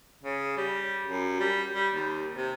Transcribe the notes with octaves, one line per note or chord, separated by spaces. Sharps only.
C#3
G3
F#2
G3
G3
D#2
C3